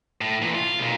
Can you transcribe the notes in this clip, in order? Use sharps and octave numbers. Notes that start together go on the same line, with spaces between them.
A2
A#2 E3
F4
B1 A#2